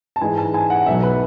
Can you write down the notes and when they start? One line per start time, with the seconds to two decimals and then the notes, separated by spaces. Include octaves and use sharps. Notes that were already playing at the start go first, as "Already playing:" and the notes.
0.16 A5
0.21 G#2 E3 G#3 G#5
0.38 A5
0.54 G#5
0.70 F#5
0.86 B1 B2 F#3 E5
1.03 B4